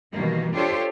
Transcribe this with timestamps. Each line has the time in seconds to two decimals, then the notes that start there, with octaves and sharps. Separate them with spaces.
0.14 B2 D#3 E3 G3 A#3
0.54 D4 F4 G4 A4 C5 C#5